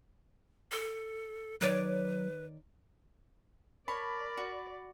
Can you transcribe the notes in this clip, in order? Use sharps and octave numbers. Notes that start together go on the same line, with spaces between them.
A4
D#3 F#3 B4 C#5 D5
A#4 C#5 D5 A5 B5
F#4